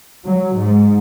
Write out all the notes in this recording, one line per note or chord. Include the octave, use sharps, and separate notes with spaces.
F#3
G#2